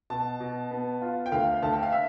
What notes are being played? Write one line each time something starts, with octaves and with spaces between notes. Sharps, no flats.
B2 A5
B2
B3
F4
G5
D2 F5
D2 A5
G5
F5
E5